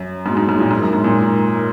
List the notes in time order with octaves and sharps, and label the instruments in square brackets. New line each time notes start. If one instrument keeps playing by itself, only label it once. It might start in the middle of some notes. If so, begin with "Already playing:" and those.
Already playing: [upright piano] F#2
[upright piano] G#2 [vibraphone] F#3 A#3 D#4 F#4
[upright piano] G#2
G#2
A#2
[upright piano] G#2 [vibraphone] G#3 D#4 A#4
[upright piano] F#2
G#2
A#2
[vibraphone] G#3 D#4 A#4